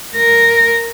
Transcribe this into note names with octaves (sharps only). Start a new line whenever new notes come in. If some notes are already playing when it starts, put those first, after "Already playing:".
A#4